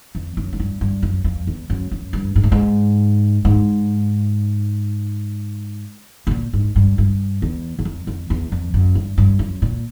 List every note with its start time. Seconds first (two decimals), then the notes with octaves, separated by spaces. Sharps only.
0.15 F2
0.37 F#2
0.53 G#2
0.60 G2
0.81 G2
1.02 F#2
1.24 F2
1.47 E2
1.70 F#2
1.91 F#2
2.13 G2
2.36 G#2
2.43 A2
2.52 G#2
3.45 G#2
6.27 B2
6.31 A#2
6.53 G#2
6.76 G2
6.98 G2
7.42 E2
7.79 E2
7.85 F2
8.07 F2
8.30 E2
8.52 F2
8.74 F#2
8.95 G2
9.18 G2
9.39 F#2
9.62 A#2